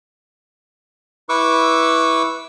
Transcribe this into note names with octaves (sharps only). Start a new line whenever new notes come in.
E4 B4 C#6 D6 E6